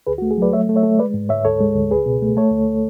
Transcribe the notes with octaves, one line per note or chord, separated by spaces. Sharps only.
D2 G#4 B4
F#4
A3
G#4
F#3 B4 D5
A3 C#5 E5
A3
C#5 E5
A3
G#3 B4 D5
G#2
G#2 C#5 E5
D2 A4 C#5
G#3
D2
C#2 G#4 B4
B2
A3
A3 A4 C#5
D2